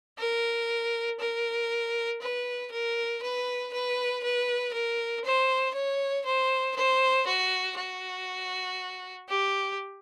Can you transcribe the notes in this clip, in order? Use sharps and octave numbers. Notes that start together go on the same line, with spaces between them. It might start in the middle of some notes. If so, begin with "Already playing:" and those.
A#4
A#4
B4
A#4
B4
B4
B4
A#4
C5
C#5
C5
C5
F#4
F#4
G4